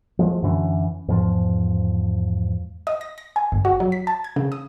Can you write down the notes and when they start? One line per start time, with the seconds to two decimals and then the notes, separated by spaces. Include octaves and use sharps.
0.19 F3 G#3 A3
0.42 F#2 D3 E3 C#4
1.08 E2 G#2 F3
2.87 D#5
3.01 A#6
3.18 A#6
3.36 G#5
3.52 G1
3.65 F#4
3.80 F#3
3.92 B6
4.07 A5
4.24 G#6
4.36 C#3
4.52 D#6